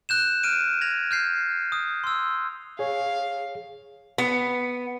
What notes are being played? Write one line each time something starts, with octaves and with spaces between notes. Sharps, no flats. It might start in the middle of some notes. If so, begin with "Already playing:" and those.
F#6 G6 E7
F6 D7 D#7
G#6 A#6 F7
F6 G6 C7
D#6
C6 E6
G#4 C#5 F5
B3